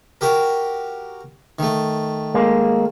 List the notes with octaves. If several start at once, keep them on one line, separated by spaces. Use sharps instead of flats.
F#4 G4 A#4
D#3 A3
G#3 A#3